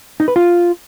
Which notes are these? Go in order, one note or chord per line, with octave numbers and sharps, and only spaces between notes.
D#4
B4
F4